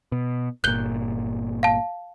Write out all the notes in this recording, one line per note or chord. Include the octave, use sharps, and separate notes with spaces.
B2
G1 A#2 F#6 G6 G7
F5 A5